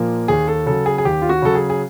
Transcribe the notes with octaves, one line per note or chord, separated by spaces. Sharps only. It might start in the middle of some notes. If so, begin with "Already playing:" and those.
Already playing: A#2 F3 A#3
D#2 G#4
A4
C#3 F#3 A4
G#4
G#4
D#2 G4
F4
F#4
C#3 F#3 A4
G#4
G#4